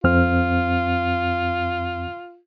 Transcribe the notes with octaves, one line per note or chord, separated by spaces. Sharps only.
F2 C4 F4 F6